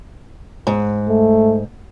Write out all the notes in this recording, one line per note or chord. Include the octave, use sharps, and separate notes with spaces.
G#2
A3